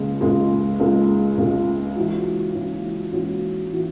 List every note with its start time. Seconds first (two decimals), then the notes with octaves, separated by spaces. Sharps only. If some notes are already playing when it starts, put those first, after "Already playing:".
Already playing: C#2 C#3 G#3
0.21 C#2 C#3 G#3
0.79 C#2 C#3 G#3
1.38 C#2 C#3 G#3
1.96 G#2 E3 C#4 F#4
2.54 G#2 E3 C#4 F#4
3.12 G#2 E3 C#4 F#4
3.72 E3 C#4 F#4